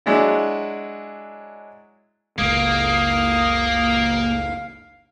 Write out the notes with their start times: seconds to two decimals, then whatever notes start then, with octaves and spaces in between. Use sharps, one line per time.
0.06 F#3 G#3 D4 E4
2.38 F#1 C#2 G#3 A#3 F5 D#6